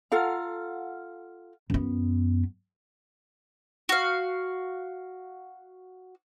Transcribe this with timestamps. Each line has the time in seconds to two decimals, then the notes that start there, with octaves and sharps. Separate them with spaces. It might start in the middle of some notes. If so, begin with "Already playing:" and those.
0.12 F4 A4 F5 F#5 A#5 F6
1.70 F#2 B3
3.89 F#4 F5